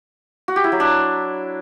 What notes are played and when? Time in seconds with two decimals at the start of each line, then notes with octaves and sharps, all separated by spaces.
0.48 F#4
0.56 G4
0.64 E4
0.72 F#3
0.80 D4